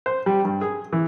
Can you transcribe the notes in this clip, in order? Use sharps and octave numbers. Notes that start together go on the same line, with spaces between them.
C5
G3
G2
G#4
E3